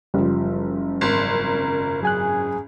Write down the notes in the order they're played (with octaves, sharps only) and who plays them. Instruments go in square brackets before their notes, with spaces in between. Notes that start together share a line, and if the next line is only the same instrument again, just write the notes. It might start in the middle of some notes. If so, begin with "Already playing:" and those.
[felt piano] F#1 F3 [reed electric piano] G3
[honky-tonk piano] G#1 [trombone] A#4
[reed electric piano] F#3 G#5 F#6 [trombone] G#4